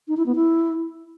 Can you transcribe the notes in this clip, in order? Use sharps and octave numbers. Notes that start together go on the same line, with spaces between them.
D#4
E4
B3
E4